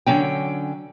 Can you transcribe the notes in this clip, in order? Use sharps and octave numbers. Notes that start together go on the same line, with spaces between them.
D3 F#3 C#4 G5